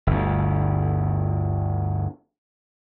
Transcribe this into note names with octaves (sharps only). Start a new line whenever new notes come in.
G1 D2